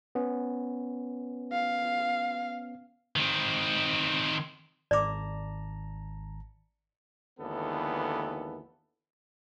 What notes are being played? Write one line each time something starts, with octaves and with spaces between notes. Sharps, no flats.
B3 C#4
F5
D#3 C4
G#1 D5 A5 A#5 D6
G#1 D#2 D3 E3 B3 A4